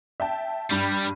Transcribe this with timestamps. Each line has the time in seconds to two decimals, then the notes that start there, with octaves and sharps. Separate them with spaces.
0.20 E5 G5 A5
0.71 G2 G3 B5